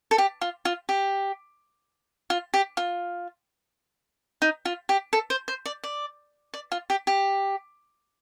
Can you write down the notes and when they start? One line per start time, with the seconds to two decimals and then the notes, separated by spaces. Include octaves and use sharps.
0.11 A4
0.18 G4
0.41 F4
0.65 F4
0.89 G4
2.30 F4
2.54 G4
2.77 F4
4.42 D#4
4.65 F4
4.89 G4
5.13 A4
5.30 C5
5.48 C5
5.66 D5
5.84 D5
6.54 D5
6.72 F4
6.90 G4
7.07 G4